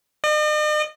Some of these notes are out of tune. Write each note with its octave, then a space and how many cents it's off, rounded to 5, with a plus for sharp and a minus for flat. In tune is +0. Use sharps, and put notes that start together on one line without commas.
D#5 -45